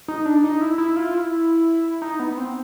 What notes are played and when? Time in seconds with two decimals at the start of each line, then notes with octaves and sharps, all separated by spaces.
0.08 D#4
0.26 D4
0.44 D#4
0.61 E4
0.78 E4
0.96 F4
1.14 E4
2.02 D#4
2.19 B3
2.37 C4